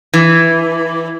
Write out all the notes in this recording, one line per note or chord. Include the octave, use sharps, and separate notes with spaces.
E3